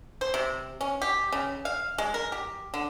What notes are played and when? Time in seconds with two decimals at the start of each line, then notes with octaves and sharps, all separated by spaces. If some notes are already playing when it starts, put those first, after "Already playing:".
0.21 C5
0.34 C3
0.81 C#4
1.02 G4
1.32 C#3
1.65 F5
1.98 G#3
2.14 A#4
2.32 G4
2.74 D3